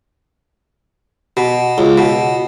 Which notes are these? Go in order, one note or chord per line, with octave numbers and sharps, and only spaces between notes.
B2
C#2
B2